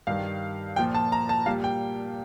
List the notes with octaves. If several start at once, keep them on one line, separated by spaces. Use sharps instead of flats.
G2 D#3 G3 F5
A#2 F3 G5
A5
A#5
A5
A#2 G3 F5
G5